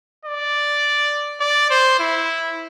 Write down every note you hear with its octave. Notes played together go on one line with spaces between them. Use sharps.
D5
D5
C5
E4